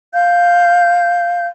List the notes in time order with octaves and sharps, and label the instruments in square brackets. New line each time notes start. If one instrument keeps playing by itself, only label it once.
[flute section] F5 G6